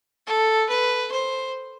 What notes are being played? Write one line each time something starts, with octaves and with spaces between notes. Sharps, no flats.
A4
B4
C5